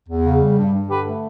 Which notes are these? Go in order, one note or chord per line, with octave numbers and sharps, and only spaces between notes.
E2
C#3
G3
G2
G2
D3 G4 B4
A3